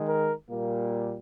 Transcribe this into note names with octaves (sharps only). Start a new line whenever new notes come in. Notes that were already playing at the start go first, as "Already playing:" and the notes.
Already playing: D#3 G#3
A#4
A#2 G3 A#3